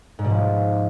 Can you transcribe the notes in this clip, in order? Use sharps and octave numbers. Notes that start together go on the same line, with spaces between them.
G#2
B2
F3